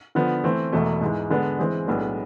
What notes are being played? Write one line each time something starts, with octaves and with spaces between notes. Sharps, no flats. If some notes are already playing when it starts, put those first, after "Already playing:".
D3 F3 B3
E3 A3 C4
E1 E2 B2 A3
G#2 E3 G#3
D3 G#3 B3 D4
E3 G#3 C4 G#4
B1 A2 G#3 B3 D4